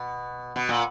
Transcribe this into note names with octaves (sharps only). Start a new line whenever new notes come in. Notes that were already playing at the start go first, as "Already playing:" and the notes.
Already playing: B2
B2
A#2